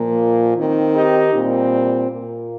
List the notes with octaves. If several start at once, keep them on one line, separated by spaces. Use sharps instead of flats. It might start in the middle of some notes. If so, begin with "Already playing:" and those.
Already playing: A#2 F3 A#3
D#3 C4
D#4 G4
A#2 G3 C4
A#2 A#3